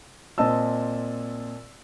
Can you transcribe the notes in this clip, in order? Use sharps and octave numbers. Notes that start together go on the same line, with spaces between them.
A#2 C4 D#5 A5 E6